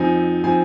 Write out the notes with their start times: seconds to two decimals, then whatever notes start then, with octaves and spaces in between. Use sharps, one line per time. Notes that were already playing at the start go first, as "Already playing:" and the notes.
Already playing: F2 F3 C4 D#4 G#5
0.44 F3 C4 D#4 G#5